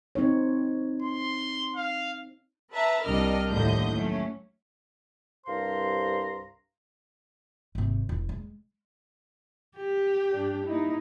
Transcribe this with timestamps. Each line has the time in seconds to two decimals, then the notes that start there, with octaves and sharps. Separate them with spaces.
0.15 C4 D#4 C#5
1.02 C6
1.76 F5
2.72 B4 E5 A5 A#5
3.04 C2 G3 D4 A#4 D#5 F6
3.50 D#2 A2 D3 F3 D#5 G6
3.95 F#3 A3 C#4
5.46 C2 G2 C5 F5 A#5 C6
7.75 G#1 C3
8.09 E1
8.29 G#3
9.76 G4
10.32 G2 D4
10.66 A#3 D#4 E4